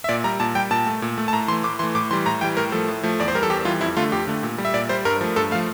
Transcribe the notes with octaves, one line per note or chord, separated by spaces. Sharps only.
E5
A#2 D5
G3 A#5
A#2 A5
G3 G5
A#2 A5
A3
A#2
A3
A5
A2 A#5
E3 A3 C6
A2 D6
E3 A3 C6
A2 D6
E3 G3 C6
A2 A#5
E3 G3 G5
A2 A#4
F3 A3 A4
A2
F3 A3
E2 D5
C5
E3 G3 A#4
A4
E2 G4
E3 G3 F4
F2 E4
D3 A3 F4
F2 G4
D3 A3
A#2
G3
E5
A#2 D5
G3 C5
G2 A#4
F3 A3
G2 A4
F3 A3 F5